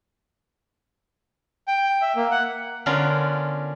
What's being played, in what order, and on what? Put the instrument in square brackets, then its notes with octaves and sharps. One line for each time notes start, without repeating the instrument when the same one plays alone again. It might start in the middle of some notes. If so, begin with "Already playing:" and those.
[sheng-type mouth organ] G5
E5
A#3
F#5
[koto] D3 B3 C#4 F4 A#4 D5